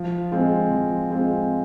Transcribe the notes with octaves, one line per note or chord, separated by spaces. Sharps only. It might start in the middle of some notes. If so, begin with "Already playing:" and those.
Already playing: F3
G#3 C4 F4
F3
G#3 C4 F4